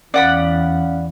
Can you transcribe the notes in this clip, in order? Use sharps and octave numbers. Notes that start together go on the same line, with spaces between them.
E2 E3 C#4 D5 F5 F#5 B5